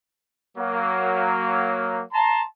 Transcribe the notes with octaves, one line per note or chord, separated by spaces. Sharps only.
F#3 A#3
A5 A#5 C6